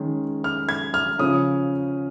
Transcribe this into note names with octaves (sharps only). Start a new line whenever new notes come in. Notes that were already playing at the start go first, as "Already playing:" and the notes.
Already playing: D#3 G#3 C#4
F6
G#6
F6
C#3 F3 C#4 D#6